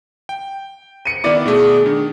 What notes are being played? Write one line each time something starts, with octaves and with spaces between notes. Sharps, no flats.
G5
C#7 D#7
D#3 B3 E4 D5 D6
B2 A3 G#4
D#3 D4